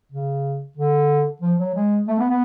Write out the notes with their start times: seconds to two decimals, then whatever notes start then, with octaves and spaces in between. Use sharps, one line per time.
0.12 C#3
0.77 D3
1.41 F3
1.59 F#3
1.75 G#3
2.08 A3
2.19 B3
2.29 B3